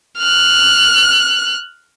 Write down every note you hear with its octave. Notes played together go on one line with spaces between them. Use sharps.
F6 F#6